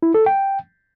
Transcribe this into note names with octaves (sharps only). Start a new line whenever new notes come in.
E4
A4
G5